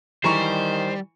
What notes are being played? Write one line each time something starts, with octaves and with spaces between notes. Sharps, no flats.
D#3 E3 G3 C5 A#5 C#6